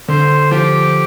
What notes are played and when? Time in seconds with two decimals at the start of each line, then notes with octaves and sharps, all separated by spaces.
0.08 D3 C5
0.51 F3 G4